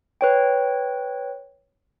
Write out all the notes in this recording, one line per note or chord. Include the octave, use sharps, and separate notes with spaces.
B4 C#5 G5